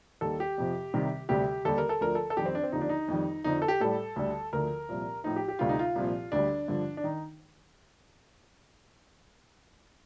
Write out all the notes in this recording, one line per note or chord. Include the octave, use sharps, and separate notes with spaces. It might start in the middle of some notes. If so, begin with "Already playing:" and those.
D#2 D#3 G3 A4
G4
F2 C3 F3
C2 C3 D#3 G3
D2 C3 G3 G4
D#2 D3 G3 A4
A#4
A4
D2 D3 F3 A#4
A4
A4
F2 D#3 G3 G4
C4
D4
C4
D#2 D3 F3 D#4
D4
D#4
F2 D#3 G3
F2 D3 F3 D#4
A4
G4
A2 G3 A4
D2 D3 G3
D2 D3 F3 A#4
C2 A#2 F3
A2 F3 D#4
G4
G4
D2 C3 G3 F4
D#4
F4
C2 A#2 F3
D2 D3 G3 D4
G2 D3 F3
D4
D#3 D#4